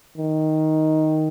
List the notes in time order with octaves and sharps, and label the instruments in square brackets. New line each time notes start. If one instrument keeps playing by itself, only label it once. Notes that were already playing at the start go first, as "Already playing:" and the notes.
[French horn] D#3